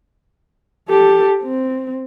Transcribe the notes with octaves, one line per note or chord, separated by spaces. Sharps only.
G4 A4
C4